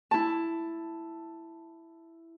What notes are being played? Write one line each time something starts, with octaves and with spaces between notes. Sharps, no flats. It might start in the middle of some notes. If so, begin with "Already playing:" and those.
E4 A5